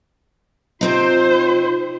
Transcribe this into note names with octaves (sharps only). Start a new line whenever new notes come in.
C3 C4 D#4 F4 C5